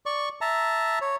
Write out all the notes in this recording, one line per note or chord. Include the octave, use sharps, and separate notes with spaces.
D5 C#6
E5 A5 A#5
C#5